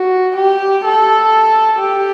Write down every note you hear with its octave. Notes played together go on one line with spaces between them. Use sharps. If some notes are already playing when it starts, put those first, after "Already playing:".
Already playing: F#4
G4
A4
G4